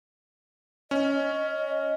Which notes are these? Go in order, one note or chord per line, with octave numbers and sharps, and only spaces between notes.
C#4 D#5